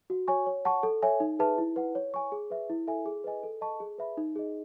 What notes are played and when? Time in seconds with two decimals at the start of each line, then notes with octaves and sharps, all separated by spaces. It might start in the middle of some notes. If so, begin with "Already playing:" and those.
0.10 F#4
0.28 C#5 G#5 C#6
0.46 C#5
0.65 F#5 A5 C#6
0.83 A4
1.02 C#5 E5 G#5
1.20 D#4
1.39 G#4 B4 E5 A5
1.58 E4
1.76 B4 F#5
1.95 C#5
2.14 G#5 C#6
2.32 G#4
2.50 B4 E5
2.70 E4
2.87 A4 E5 G#5
3.06 G#4
3.24 B4 D#5 G#5
3.43 A4
3.61 D#5 A5 C#6
3.80 G#4
3.98 B4 E5 B5
4.17 D#4
4.36 G#4 D#5